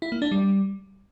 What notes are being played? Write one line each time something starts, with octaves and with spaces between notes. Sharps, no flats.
E4
A#3
D4
G3